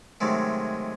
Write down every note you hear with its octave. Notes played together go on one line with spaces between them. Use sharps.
C3 D#3 F#3 G#3 A3